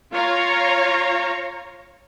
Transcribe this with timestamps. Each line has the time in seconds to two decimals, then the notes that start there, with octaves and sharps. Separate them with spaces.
0.13 F4 C#5 F5 A#5